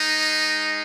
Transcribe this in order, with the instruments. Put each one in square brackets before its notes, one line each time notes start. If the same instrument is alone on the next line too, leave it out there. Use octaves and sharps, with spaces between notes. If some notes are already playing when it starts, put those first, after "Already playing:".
Already playing: [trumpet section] G#3 D#4